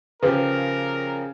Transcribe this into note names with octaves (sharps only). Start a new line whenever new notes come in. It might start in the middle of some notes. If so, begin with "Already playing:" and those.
C#3 F3 G4 A#4 B4